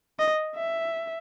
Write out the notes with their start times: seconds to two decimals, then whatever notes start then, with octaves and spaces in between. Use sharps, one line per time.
0.19 D#5
0.56 E5